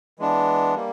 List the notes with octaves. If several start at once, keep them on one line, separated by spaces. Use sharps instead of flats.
E3 G#3 B3 D4
G3 A#3